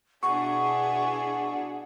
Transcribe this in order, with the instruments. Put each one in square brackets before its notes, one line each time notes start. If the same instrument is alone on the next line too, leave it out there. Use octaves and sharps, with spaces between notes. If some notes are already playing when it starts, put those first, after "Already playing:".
[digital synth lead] B2 [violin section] D4 E4 G#4 [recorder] F#5 [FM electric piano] C#6